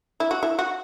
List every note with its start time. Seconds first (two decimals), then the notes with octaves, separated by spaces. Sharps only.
0.20 E4
0.31 F#4
0.43 E4
0.59 F#4